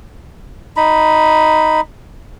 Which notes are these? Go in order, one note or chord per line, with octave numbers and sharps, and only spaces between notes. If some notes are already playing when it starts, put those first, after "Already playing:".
D#4 B5